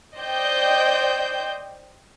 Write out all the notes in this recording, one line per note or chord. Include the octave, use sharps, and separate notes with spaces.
C5 D5 D#5 G5 G6